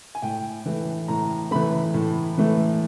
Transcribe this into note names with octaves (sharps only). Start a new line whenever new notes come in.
G#5
A2 G5
E3 A3
A2 A#5
E3 A3 B5
A2
E3 A3